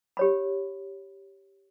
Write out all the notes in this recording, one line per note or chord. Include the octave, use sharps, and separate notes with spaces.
G4 C#5 B5